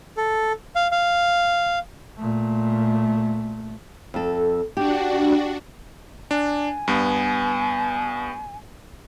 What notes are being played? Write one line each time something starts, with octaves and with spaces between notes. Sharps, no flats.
A4
F5
F5
A#2 A3
F2 A4
D4 F#4 G4
D4 G#5
G2 B3